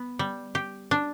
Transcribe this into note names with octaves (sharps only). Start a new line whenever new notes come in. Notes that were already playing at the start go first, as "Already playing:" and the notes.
Already playing: B3
G3
G4
D4